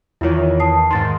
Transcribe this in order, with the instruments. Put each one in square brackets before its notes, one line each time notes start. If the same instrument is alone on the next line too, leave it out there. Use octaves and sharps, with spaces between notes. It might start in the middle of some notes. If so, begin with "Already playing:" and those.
[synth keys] E2 D#3 E3 [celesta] E4 F4 C#5
[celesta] A5 D#6 C7
[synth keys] G#2 D#3 [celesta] C6 A6